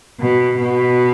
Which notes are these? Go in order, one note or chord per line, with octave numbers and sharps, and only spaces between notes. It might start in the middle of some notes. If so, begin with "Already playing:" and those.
B2
B2